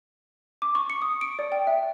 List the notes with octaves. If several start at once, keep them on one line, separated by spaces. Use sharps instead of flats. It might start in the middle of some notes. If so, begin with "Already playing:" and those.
D6
C#6
C#7
D#6
D7
D5
G5
E5